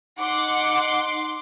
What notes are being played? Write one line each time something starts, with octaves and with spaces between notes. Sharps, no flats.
D#4 F#5 C6 D6